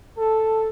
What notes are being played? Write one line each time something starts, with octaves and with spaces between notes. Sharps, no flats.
A4